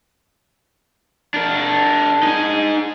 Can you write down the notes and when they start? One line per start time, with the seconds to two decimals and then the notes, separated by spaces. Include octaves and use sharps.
1.34 D4 A#4
2.23 D#4 G#5